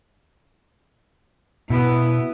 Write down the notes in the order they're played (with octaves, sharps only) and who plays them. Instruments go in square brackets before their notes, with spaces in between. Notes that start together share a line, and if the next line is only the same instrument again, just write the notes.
[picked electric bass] B2 [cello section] B3 E4